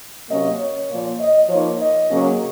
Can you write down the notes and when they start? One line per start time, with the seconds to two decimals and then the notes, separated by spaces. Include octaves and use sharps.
0.29 C3 F#3 A#3 C#4 D#5
0.59 C#5
0.90 A#2 F3 A#3
1.20 D#5
1.49 F3 A#3 D#4 C#5
1.80 D#5
2.10 C#3 F#3 A#3 C#4